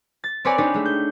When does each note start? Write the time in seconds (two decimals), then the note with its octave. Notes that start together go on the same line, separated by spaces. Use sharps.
0.24 A6
0.45 C4 B4 C#5 D5 G#5
0.58 D4 D#4 G4 B4 C#5
0.74 G#3 A3
0.85 G6